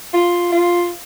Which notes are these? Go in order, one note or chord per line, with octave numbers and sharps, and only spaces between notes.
F4
F4